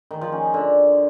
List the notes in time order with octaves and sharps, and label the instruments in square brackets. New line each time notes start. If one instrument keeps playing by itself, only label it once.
[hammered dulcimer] D#3
F3
C#4
D#4
D3